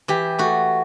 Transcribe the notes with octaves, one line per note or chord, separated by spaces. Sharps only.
E3 G4
A3 F#4